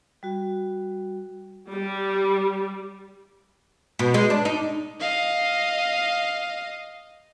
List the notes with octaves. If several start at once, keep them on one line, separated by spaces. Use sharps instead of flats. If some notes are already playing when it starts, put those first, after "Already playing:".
G3 F#4
G3
B2
G#3
D4
D#4
D#5 F5